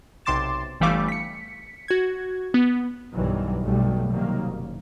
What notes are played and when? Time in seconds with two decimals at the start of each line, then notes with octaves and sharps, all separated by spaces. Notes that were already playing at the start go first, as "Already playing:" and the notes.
0.25 B1 C3 C6 D6 A6 E7
0.80 G1 E3 G3 A3 F5 D6
1.08 B6 C#7
1.88 F#4 G#6
2.54 B3
3.12 B1 G2 D#3 E3 F#3 G3
3.61 B1 F#2 B2 F#3 G3 A3
4.10 C3 D#3 F#3 G3 A#3
4.44 F#1